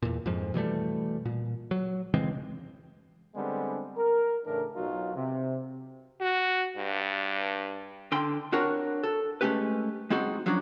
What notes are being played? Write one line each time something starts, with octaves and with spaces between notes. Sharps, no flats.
E2 A#2
F2 G#2 F3
B2 E3 G3 A3
A#2
F#3
C#3 E3 G#3 C4
D3 G3 G#3 B3 C4 D4
A#4
A2 C#3 E3 D4 A#4
B1 F#3 D#4 F4 F#4
C3
F#4
G2
D3 G5 C6
C4 D4 F#4 A#4 C#5
A4
G#3 A3 C#4 G4 B4
G#3 C4 D#4 F#4
F3 F#3 C#4 D4 F#4